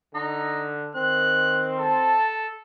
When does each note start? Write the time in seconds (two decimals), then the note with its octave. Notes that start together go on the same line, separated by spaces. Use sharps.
0.14 D3 D#4
0.95 D#3 C4 F#6
1.78 A4 A5